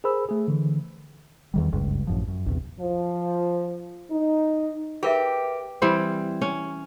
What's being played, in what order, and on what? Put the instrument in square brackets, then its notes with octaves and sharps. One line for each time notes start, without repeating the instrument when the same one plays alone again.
[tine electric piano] G#4 A#4 C5 B5 E6
A3 G#4
D3 E3
[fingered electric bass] E2 D#3 G3
F#1 C#2 G2
A1 F#2 F3
F#2
A#1 E2 C3
[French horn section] F3
D#4
[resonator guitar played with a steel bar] G4 [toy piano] G#4 A#4 E5 [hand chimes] B4 G5
[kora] E3 G3 C4 C5
C#4